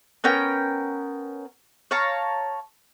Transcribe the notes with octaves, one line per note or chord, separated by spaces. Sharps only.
B3 C#4 A#4 G5
C#5 F5 A5 A#5